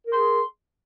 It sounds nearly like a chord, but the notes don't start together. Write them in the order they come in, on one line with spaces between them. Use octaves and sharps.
A#4 G#4 C6